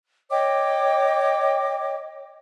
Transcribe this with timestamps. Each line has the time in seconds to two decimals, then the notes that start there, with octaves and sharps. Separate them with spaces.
0.31 C#5 D#5 G5 D6